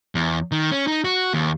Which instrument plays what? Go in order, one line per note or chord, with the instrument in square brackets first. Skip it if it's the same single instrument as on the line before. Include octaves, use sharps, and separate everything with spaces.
[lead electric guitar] E2
D#3
C#4
D#4
F#4
D#2